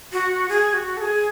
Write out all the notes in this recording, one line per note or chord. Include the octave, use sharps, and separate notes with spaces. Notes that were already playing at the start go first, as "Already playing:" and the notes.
F#4
G#4
F#4
A4
G#4